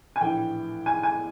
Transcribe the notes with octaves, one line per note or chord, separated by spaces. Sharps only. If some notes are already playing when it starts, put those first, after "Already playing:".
G#5
A#1 A2 E3 G5
G#5
G#5